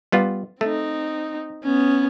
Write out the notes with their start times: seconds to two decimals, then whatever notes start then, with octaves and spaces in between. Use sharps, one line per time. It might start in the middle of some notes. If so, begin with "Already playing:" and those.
0.12 G3 B3 F4
0.61 A3 C4 D#4
1.64 B3 C#4